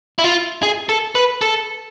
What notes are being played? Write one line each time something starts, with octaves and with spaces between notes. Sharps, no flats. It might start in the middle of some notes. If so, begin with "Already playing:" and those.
E4
F4
G#4
A4
B4
A4